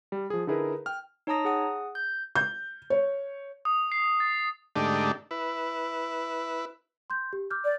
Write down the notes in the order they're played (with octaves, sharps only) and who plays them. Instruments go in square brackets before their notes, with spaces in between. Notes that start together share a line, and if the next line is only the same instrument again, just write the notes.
[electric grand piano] G3
F3 G#4
D3 D#4 E4 G#4 A#4 B4
G5 F6
[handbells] D#4 C#5 A5 A#5 D#6 A#6
G#4 F#5 D#6
G6
[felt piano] G6
C#5
[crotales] D#6
C7
A6
[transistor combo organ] G#2 D3 A3 D4 D#4 G4
E4 B4
[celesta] C6 G6
G4
D6 F6 G6
[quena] D5